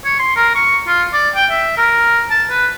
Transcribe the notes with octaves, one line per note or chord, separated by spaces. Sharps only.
C#5
C6
A#4
C#6
F4
D5
G5
E5
A#4
A5
B4